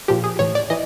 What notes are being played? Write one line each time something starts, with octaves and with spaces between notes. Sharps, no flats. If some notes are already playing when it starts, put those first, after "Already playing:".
A#2 F3 G4
G#4
A2 E3 C#5
D5
E3 D#5